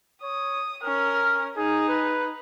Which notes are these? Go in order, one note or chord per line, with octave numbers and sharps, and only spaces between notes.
C#5 D#6
C#4 A#4 F6
D#4 G#4
B4